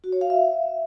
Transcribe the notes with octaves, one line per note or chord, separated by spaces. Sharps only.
F#4
C#5
F5
E5